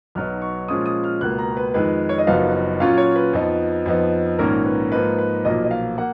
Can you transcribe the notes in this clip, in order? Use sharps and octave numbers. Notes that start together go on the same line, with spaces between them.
B1 B2 F#3 B3 D#4 F6
C#6
A#2 F3 G#3 C#4 F4 D#6
D#6
F6
C#2 B2 A#3 F#6
A#5
B4
F2 D#3 G#3 B4
C#5
D#5
F#1 F#2 F3 B3 D#4 F5
A#2 F#3 C#4 F4 F5
C#5
B4
F2 F3 B3 D#4
F2 F3 B3 D#4
A#1 G#2 D#3 A#3 C#4 A#4
B4
G#2 F3 A#3 D#4 B4
B4
B1 A#2 F3 A#3 D#5
D#5
F5
A#3 F#5